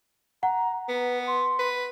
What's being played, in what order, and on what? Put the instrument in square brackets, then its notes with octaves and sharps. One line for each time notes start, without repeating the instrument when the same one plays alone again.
[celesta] F#5 [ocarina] A#5
[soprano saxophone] B3 [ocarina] B4
[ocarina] C6
[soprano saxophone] B4